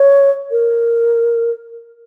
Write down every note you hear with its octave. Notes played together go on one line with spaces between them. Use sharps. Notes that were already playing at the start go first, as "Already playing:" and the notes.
Already playing: C#5
A#4